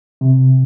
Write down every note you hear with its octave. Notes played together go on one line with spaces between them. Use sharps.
C3